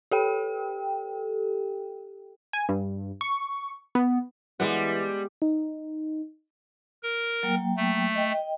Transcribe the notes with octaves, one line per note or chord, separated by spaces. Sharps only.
G4 A4 G5
G#5
G2
C#6
B3
E3 G3 G#3 B3 F#5
D#4
A#4
F#3 A#3 G5
A3
D#5 G5